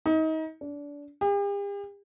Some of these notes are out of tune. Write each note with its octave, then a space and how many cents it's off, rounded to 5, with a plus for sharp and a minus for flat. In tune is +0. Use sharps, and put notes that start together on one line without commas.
D#4 +30
D4 -25
G4 +45